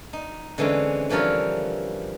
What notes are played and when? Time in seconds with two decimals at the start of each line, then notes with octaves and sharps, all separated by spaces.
0.13 D#4
0.58 D3 E3 G#3 C4 C#4
1.09 D3 E3 F3 G3 A#4 C#5